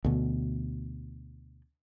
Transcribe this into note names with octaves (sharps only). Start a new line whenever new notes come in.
D2 B2